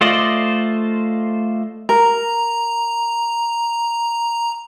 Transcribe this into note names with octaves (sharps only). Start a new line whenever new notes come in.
A3 F4 C5 D5 D#5
A#4 A#5